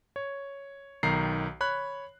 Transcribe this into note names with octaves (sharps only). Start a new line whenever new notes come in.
C#5
B1 D#3 A#5 C7
C#5 B5 F#6